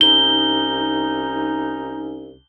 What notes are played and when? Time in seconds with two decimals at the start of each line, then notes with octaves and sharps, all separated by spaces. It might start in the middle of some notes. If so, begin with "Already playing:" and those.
0.01 C2 C#4 D#4 G7